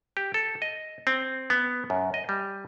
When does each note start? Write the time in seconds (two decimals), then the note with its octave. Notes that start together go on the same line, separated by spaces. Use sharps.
0.17 G4
0.34 A4
0.62 D#5
1.07 C4
1.50 B3
1.90 F#2
2.14 D#5
2.29 G3